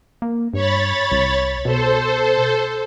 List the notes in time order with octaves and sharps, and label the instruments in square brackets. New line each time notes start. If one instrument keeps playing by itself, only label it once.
[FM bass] A#3
[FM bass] G2 [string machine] C#5 B5 A6
[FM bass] C2
[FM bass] B2 [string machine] A4 C5